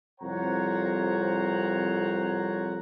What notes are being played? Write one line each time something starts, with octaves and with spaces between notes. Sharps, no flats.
C2 F2 C5 C#5 F#5 A#5